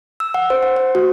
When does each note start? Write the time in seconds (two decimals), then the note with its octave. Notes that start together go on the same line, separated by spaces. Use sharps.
0.20 E6
0.34 F#5
0.50 C5
0.63 F#5
0.76 C5
0.95 F#4